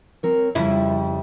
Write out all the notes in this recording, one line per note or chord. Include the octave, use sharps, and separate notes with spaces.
C4 A#4 C#5
F2 C#3 G3 E4